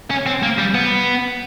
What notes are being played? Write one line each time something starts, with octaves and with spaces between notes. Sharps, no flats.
C#4
C4
A#3
G3
B3